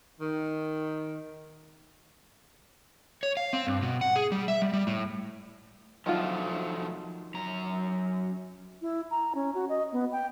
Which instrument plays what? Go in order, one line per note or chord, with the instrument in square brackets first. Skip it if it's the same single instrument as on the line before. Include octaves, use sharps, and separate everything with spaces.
[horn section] D#3
[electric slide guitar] C#5
F5
C4
G2
B2
F#5
G#4
G3
E5
G3
G3
A2
[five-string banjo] D#3 F#3 F4 [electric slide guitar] F3 A3 D4
[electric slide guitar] F#2 A#5
[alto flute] E4
A#5
C#4
F#4
D#5
B3
G5